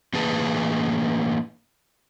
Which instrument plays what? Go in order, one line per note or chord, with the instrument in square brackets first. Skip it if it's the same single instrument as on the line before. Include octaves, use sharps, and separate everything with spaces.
[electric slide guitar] A2 E3 A#3 G#4 B4 A5